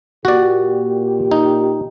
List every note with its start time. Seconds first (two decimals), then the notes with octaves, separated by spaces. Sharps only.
0.25 A#2 F#4 G4 D5
1.31 D#4